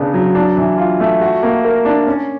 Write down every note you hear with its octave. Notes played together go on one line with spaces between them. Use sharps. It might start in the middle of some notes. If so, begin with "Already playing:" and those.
Already playing: C#3 B3 D4
F#3
D4
E3
F4
A3
F#4
A#3
A#4
D4
C#4